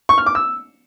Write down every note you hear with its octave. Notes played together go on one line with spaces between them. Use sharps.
C#6
F6
D6
E6